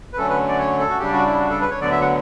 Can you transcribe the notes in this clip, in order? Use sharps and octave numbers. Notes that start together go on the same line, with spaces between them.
B4
D3 F#3 A3 C#4 A4
B4
D5
C#5
A4
F#4
C#3 G3 D4 G4
F#4
E4
F#4
A4
B4
C#5
D2 D3 F#3 B3 D5
E5
F#5